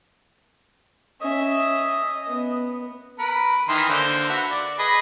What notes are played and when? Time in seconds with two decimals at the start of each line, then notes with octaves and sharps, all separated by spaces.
1.21 C#4 D#5 E5
2.27 B3
3.19 A#4 B4
3.69 D#3 E3 C6
3.89 D3 A#3 C5
4.29 F#4 B4 E5
4.50 D5
4.79 G#4 B4 D#5